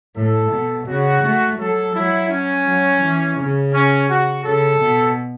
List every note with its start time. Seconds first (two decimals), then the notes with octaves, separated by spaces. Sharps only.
0.16 A2 A4
0.52 B2
0.88 C#3 F#4
1.23 A3
1.59 F#3 A4
1.95 F#3 E4
2.30 C#4
2.66 F#3
3.01 E3
3.37 C#3
3.73 C#4
4.09 F#4
4.44 C#3 A4
4.80 B2